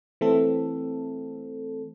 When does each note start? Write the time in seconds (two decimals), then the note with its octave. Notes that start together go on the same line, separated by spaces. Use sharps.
0.21 E3 A3 C4 A4